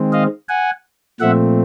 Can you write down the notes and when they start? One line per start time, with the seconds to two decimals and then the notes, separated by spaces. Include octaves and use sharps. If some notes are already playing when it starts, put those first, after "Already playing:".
Already playing: D#3 G#3 C4
0.12 D#5 F5
0.49 F#5 G#5
1.20 A#2 F3 A3 C4 E5 F#5